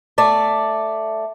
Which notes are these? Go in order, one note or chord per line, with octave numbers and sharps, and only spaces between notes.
A3 D5